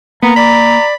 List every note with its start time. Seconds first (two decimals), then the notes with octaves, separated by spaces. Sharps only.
0.23 A#3 B3 A#5
0.36 D5 B5